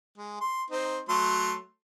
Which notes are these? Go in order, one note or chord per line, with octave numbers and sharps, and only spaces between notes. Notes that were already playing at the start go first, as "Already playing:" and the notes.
G#3
C6
C4 D#4
F#3 A3 C6